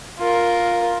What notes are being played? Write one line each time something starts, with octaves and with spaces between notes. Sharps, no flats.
F4 A#4